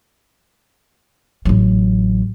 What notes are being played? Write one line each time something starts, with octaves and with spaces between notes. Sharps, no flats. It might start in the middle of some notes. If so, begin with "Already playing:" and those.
A1 F#3